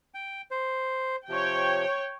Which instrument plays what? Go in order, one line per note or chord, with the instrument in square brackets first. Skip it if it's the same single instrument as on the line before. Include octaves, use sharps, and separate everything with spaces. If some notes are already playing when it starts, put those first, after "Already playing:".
[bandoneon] G5
C5
[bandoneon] C3 F3 [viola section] C#5 G5